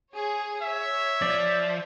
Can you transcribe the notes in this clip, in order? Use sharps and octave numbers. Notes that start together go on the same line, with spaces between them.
G#4 C#5
C#5 E5
F3 D5